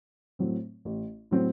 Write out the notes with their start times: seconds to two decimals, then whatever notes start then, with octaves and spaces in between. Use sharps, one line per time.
0.39 A2 F#3 C4
0.85 A1
1.31 A2 F#3 C4